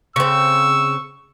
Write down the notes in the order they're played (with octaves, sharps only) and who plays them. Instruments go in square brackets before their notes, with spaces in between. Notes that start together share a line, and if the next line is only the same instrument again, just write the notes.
[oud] C#3 C4 [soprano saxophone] C#6 [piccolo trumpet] E6